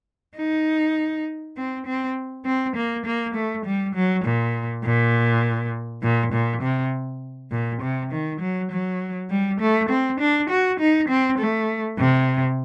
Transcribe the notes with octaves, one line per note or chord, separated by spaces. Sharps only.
D#4
C4
C4
C4
A#3
A#3
A3
G3
F#3
A#2
A#2
A#2
A#2
C3
A#2
C3
D#3
F#3
F#3
G3
A3
C4
D4
F#4
D#4
C4
A3
C3